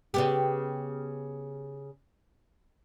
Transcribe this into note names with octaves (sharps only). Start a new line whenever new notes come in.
C#3 B3 G4